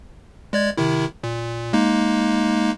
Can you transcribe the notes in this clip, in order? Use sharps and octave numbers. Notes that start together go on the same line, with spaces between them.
G#3 D5 G#6
C3 D#3 E4
A#2
G#3 A#3 D#4